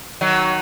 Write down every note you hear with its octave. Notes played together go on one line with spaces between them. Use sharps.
D#3 F#3